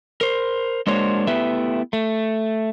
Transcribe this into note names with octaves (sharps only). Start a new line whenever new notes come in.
A#4 C5
G#3 A#3 D4 F#4 C5 C#5
A3 B3 E4 G4 B4 E5
A3